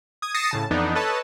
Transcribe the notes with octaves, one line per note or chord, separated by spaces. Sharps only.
D#6 G#6
D#6 A6 A#6 C7 C#7 E7
A2 C#3 A5
F2 E3 B3 D4 D#4
A4 B4 C#5 D#5 A5